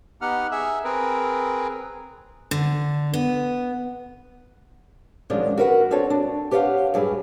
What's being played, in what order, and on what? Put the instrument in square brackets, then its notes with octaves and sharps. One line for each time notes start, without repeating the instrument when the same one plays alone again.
[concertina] B3 D#4 G4 F#5 F6
G#4 E5
C4 G#4 A#4 B4
[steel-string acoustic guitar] D3
B3
D#3 F3 F#3 G#3 C#4 D4
F#4 A#4 B4 F5 F#5
C4 D4 F#4 A4 B4 C#5
D4
G4 B4 C#5 D5 F5 F#5
G2 F#3 G#4 B4